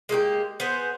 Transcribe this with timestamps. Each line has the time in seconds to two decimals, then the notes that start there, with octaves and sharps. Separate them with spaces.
0.09 G#3 A#3 F#4 G4
0.60 B3 G#4 C5